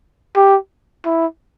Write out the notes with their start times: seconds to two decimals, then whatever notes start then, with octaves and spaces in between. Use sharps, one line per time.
0.36 G4
1.05 E4